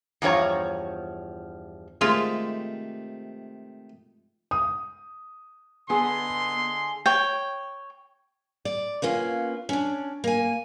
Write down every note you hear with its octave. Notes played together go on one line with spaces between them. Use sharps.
E2 G2 F3 C#5 A#5
C3 D#3 G#3 A3 F4
D#6
D3 B3 G#4 D#5 C6
C#5 G5
D5
A#3 B3 C#4 F4
C#4 D4
A#3 G#5